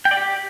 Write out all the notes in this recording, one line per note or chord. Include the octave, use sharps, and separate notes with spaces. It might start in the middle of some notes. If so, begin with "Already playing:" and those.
G5
D5
G4